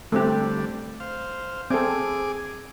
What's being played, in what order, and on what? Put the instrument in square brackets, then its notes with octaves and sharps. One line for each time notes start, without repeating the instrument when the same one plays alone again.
[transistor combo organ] D3 G3 [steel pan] A3 C4 G4
[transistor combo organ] C5 F5
[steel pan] C4 A4 [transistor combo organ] G#4 D6